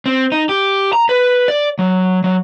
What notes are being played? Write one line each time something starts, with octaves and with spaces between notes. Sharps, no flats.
C4
D#4
G4
A#5
B4
D5
F#3
F#3